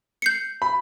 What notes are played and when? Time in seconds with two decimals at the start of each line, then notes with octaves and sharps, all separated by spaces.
0.22 G6 C7 C#7
0.62 B5